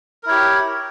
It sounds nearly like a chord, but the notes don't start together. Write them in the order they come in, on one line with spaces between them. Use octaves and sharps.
A#4 E4 C#5 G4